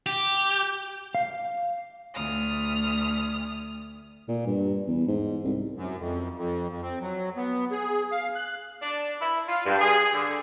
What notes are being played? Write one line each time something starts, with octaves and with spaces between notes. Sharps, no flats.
G4
F5
D2 D#6 F6
A#2
G2
E2
G#2
C2
F#2
F2
F2
F2
C4
F#3
B3
G#4
F5
F#6
D4
E4
F4
G2
G#4
D3